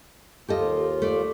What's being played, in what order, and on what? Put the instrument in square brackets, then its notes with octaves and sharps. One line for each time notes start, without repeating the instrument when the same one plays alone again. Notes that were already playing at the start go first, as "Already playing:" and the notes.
[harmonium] D#2 F4 [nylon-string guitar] G4 A4 D#5
[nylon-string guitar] A3 D5